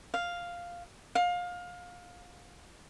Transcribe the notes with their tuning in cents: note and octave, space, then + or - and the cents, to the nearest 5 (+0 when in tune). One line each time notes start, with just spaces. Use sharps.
F5 +0
F5 +25